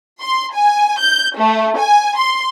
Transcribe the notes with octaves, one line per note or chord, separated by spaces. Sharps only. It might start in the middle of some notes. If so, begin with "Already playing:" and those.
C6
G#5
G6
A3
G#5
C6